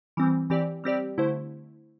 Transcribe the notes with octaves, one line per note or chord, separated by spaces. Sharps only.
E3 G3 C4
E3 C4 G4 D5
G3 C4 G4 D5
D3 A3 E4 C5